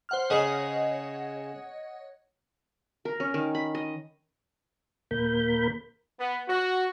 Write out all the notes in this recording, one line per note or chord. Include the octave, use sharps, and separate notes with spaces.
C5 F#5 F6
C#3 G#4 C#5 D#5 F#5
A#4
C#4
D#3
B5
D#5
D#2 A#2 A#3 A#4 B5 G6
B3
F#4